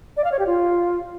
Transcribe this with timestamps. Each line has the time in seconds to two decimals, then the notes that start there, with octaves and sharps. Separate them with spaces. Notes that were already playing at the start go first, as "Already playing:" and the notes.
0.17 D5
0.24 F5
0.32 C#5
0.39 G4
0.46 F4